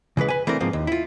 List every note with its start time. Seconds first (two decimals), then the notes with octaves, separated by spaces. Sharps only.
0.17 C#3 E3 G#3 B4
0.28 B4 G#5
0.47 E3 A3 C4 D4 A#4
0.60 G#2 F3 A#3 C4
0.73 D#2
0.87 E4 F4